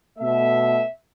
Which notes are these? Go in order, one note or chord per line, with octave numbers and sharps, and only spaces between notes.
B2 A3 E5